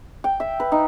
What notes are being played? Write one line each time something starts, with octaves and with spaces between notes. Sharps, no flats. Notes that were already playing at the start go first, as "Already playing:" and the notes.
G5
E5
B4
D#4